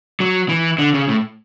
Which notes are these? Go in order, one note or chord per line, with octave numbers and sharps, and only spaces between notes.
F#3
E3
D3
C#3
A2